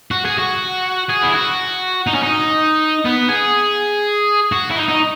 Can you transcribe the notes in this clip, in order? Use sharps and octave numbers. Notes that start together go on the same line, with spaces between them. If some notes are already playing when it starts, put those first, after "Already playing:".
F#4
G#4
F#4
G#4
E4
F#4
D#4
C#4
D#4
B3
G#4
F#4
E4
D#4
D#4